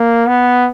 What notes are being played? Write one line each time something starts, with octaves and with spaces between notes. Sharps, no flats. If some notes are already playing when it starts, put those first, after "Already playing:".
Already playing: A#3
B3